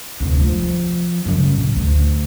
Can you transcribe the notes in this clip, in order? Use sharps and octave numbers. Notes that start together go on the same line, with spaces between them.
F1 D2
F3
F#2 C#3
A2
D2